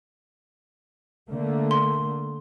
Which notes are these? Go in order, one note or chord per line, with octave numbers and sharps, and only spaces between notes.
D3 A3 A#3
C6